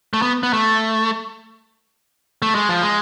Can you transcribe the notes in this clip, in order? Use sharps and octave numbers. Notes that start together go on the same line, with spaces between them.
A3
B3
B3
A3
A3
G#3
F3
G#3